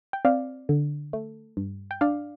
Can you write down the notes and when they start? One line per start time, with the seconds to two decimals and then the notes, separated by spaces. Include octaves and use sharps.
0.13 G5
0.25 C4 D5 F5
0.69 D3
1.13 A3
1.57 G2
1.91 G5
2.01 D4 D5 F5